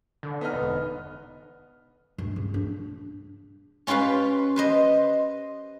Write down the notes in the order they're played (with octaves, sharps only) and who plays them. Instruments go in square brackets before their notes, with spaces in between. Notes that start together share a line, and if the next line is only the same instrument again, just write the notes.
[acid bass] D3
[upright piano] B3 D#4 F6
[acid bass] E1
[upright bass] G2
C#3
D4
[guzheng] C#4 F4 G4 B4 F5
B4 C5 D#5